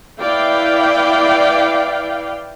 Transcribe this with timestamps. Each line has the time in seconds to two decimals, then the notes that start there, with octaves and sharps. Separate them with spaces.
0.20 E4 B4 D5 F5 G5